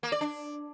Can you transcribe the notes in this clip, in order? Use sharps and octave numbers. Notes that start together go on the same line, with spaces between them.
A#3
D5
D4